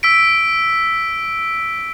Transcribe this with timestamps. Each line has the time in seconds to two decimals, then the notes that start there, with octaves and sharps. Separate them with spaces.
0.03 E6 B6 D7